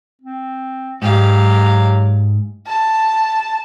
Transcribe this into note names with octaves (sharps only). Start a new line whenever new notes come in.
C4
G#2 F#3 G4 F5
A5